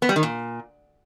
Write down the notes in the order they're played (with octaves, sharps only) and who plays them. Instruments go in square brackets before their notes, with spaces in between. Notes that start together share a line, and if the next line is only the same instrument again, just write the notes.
[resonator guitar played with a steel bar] B3
G3
D#3
A#2